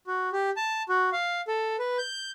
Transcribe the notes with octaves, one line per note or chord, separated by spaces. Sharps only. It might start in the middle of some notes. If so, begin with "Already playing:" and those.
F#4
G4
A5
F#4
F5
A4
B4
G6